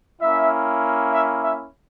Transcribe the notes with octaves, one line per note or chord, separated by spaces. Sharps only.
A#3 C#4 E4 E5
E5
E5